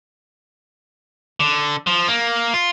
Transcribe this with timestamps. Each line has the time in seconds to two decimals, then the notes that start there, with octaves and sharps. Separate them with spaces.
1.40 D3
1.87 F3
2.08 A#3
2.54 F4